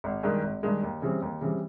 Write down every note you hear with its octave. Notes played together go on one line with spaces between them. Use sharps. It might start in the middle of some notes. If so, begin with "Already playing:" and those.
G#1
G2 D#3 G#3
G#1
G2 D#3 G#3
D#2
C#3 E3 G3 C4
D#2
C#3 E3 G3 C4